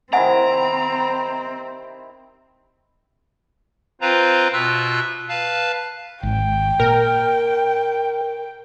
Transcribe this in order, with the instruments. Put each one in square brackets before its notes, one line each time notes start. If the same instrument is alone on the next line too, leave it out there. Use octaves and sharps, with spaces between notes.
[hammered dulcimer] C3 D#3 E4 [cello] C4 [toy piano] E5 F#5 G#5 [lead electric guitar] A#5
[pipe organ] C4 F4 B4 C5 F5 A#5
B2 F4 E5 E6 F#6
B4 F5 A5
[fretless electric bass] G#1 [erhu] G5
[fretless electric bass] A#2 [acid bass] A#4